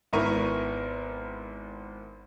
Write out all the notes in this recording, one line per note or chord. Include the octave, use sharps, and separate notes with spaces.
G#1 B3 E4 A#4 C#6 D#7